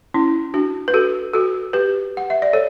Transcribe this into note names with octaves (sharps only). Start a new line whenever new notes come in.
C#4 E4
D4 F#4
B4
F#4 A4
F#4 A4
G4 B4
F#5
E5
D5
A4 C#5